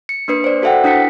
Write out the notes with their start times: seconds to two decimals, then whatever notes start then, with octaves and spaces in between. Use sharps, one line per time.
0.09 C#7
0.28 A#3 D4 B4 C#7
0.44 C5 D5
0.62 F#4 A4 C5 E5 F#5 G5
0.84 D4 E4 B6 C#7